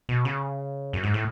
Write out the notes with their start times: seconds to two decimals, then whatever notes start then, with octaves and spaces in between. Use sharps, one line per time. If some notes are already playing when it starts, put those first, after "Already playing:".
0.09 B2
0.25 C#3
0.93 F#2
1.03 G#2
1.14 A2